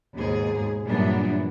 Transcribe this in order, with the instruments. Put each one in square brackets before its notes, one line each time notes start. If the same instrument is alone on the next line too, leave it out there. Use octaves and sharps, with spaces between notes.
[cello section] D#2 G#2 B2 G#4
G2 A#2 E3 F#3 B3 D4